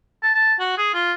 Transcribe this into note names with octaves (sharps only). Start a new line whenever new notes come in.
A5
A5
F#4
G#4
F4